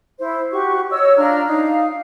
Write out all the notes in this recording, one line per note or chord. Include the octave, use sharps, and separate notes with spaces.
E4 C5
F#4 G4 C#6
C#5 D#5 E6
D4 F4 A#5 F6
D#4 F5